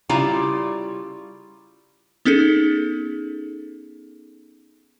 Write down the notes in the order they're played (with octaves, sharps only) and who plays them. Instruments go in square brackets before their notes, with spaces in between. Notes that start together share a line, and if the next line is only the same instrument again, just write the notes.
[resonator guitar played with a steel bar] C#3 G3 E4 F4 D5 A#5
[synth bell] B3 C#4 D#4 G#4 A4